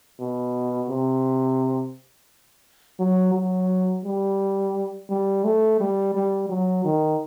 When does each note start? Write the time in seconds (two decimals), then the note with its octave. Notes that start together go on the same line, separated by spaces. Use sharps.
0.20 B2
0.90 C3
2.99 F#3
3.34 F#3
4.05 G3
5.10 G3
5.44 A3
5.80 G3
6.15 G3
6.49 F#3
6.85 D#3